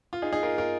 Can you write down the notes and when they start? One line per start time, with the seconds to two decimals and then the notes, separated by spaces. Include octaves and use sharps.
0.13 F4
0.22 D#4 G#4
0.33 D#4 G#4
0.43 F4 A#4
0.58 F4 A#4